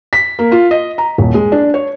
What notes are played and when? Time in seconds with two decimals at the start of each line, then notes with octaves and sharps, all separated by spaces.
0.13 B6
0.39 A#3
0.52 F4
0.71 D#5
0.98 A#5
1.18 D#1
1.34 G#3
1.52 D4
1.74 C#5